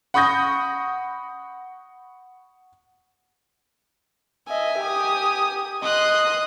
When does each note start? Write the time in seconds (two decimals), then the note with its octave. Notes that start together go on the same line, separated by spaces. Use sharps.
0.14 F#5 B5 C#6 D#6 G6 A#6
4.48 D#5 E5 G#5
4.79 G4 D#6
5.83 D#5 C6 D#6 F#6